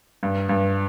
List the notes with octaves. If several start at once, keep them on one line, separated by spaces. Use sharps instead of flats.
G2
G2